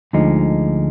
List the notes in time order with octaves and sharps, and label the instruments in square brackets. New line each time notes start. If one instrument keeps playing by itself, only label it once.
[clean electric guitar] D2 D3 F3 G#3 D#4